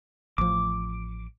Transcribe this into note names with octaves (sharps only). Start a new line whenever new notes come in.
A1 F3 D6